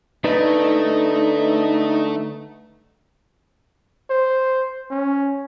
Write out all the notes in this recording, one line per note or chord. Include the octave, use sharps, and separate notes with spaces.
D3 A3 D#4 B4 D5
C5
C#4